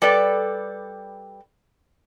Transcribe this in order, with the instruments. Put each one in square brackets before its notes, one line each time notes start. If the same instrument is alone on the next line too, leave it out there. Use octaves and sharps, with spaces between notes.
[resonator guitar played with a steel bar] G3 A4 B4 D5